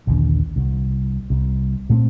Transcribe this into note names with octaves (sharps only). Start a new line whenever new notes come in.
A#1 D#2 D3
C2
C2
A#2 A3 C4